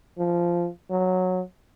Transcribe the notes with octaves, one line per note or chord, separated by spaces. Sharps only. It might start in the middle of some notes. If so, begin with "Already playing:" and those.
F3
F#3